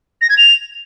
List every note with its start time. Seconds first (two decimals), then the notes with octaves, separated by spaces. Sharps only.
0.21 A#6
0.30 G#6
0.38 F7